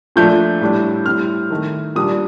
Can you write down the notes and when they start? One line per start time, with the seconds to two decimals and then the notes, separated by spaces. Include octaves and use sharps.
0.16 A#2 F3 A3 D4 G6
0.61 A2 G3 D4
1.06 A2 G3 C4 F6
1.50 D#3 A3 D#4
1.95 A#2 G3 D4 D#6